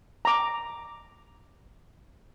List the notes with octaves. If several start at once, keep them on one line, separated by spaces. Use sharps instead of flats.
A#5 D6